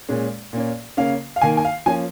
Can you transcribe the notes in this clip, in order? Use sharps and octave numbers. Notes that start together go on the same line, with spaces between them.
A#2 G#3 C#4
A#2 A#3 C#4
C#3 A#3 C#4 F5
F5
D#3 A#3 D#4 G#5
G#5
F5
F3 A#3 C#4 G#5